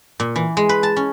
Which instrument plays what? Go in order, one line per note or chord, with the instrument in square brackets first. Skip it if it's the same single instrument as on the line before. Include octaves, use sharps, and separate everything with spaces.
[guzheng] A#2
E3
G#3
B4
A5
C#4